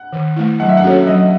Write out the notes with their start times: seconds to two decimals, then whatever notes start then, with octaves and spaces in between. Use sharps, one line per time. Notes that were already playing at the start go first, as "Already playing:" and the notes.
Already playing: F#5
0.13 D#3
0.36 A3 E4
0.60 F#3 F#5
0.69 E5
0.77 F#5
0.84 C#4 F#4 A4 C#5
1.07 F#3 D#5